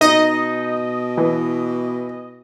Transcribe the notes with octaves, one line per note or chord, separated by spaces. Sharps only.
B2 D#4 D#5
E3